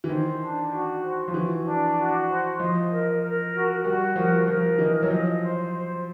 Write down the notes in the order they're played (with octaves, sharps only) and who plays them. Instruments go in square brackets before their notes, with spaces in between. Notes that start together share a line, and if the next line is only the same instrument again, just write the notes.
[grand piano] E3
[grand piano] D#3 [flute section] C5
[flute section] D4
F#4
C5
[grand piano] F3
[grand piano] E3 [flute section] F#4
[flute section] D4
F#4
C5
[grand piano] F3 [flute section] D#5
[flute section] A#4
A#4
F#4
[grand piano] G3 [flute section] F#4
[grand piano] F3 [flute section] A#4
[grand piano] F3 [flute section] A#4
[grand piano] E3 [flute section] D#5
[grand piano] F#3
[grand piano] F3 [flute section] D#5
[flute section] C5
C5